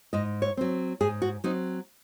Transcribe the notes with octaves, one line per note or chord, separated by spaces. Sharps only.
G#2 D#5
C#5
F#3 C4
G#2 G#4
F#4
F#3 C4 D#4